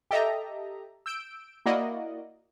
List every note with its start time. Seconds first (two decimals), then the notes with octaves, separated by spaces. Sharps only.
0.11 G4 A4 D#5 E5 A#5
1.06 E6 G6 D7
1.66 A#3 E4 F#4 D5 D#5